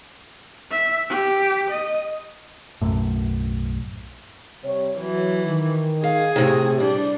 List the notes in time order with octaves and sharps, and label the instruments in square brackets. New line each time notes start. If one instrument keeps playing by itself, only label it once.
[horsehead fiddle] E5
G4
D#5
[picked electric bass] B1 F#2 A2
[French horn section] C3 G3 C#5
[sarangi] E3 [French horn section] F#3
[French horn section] D#3
[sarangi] G#4 [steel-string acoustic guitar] F5
[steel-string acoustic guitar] A2 C3 D#3 [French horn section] G4
[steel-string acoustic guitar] G3 [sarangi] D4